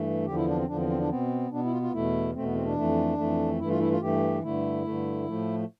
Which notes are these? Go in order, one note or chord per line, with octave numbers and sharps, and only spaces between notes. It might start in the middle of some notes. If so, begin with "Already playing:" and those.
Already playing: G2 E3 A3
E2 D3 F3 G4
E4
D4
C4
E2 D3 F3 D4
C4
C4
D4
B2 B3 C4
B2 B3 D4
E4
F4
F4
E2 B2 A3 E4
E2 B2 A3 C4
B3
C4
D4
F2 E3 A3
F2 E3 A3
G2 E3 A3 E4
F4
E4
F4
G2 E3 A3 G4
G2 D3 A3 E4
G2 D3 A3
A2 F3 A3